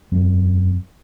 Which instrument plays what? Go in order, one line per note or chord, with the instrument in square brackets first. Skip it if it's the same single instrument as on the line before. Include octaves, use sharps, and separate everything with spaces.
[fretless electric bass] E1 F#2 F#3 C4